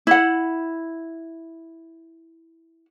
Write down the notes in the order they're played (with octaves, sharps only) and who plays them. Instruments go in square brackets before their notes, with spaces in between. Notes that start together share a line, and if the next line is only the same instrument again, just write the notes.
[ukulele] E4 F#5